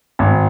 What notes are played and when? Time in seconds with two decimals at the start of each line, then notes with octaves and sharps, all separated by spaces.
0.19 G#1